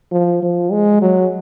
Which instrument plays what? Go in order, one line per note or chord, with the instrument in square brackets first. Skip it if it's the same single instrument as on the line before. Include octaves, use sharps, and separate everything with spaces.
[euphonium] F3
F3
G#3
F#3